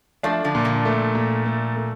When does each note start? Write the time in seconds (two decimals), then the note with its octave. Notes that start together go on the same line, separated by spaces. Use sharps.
0.23 F3 A3 D4
0.44 D3 F3
0.55 A#2
0.65 D3 F3
0.85 A3
1.15 A#2
1.46 A3
1.77 A3